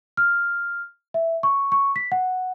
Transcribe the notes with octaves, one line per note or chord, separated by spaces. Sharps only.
F6
E5
C#6
C#6
B6
F#5